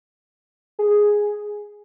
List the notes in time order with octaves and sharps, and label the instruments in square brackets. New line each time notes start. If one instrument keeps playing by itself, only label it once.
[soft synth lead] G#4